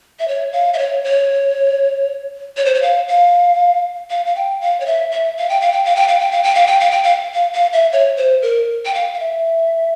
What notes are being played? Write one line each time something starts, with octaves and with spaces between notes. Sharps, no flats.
E5
C#5
F5
E5
C#5
C#5
C#5
C5
C#5
F5
F5
F5
F5
G5
F5
C#5
E5
E5
F5
G5
F5
G5
F5
G5
F5
G5
F5
G5
F5
G5
F5
G5
F5
F5
F5
E5
C#5
C5
A#4
G5
F5
F5
E5